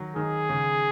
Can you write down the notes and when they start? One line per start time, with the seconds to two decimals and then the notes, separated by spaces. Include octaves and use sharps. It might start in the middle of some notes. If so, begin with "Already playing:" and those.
Already playing: D#3 F#3
0.16 D#3 G#4
0.49 C#3